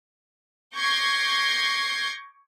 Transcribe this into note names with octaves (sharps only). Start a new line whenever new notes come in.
C#6 D6 G6 G#6 A#6 C7